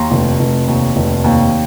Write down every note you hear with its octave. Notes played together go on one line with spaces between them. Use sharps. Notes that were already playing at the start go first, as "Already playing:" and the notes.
Already playing: D#2 A#5 C6
F1
F1
D#2
F1
D#2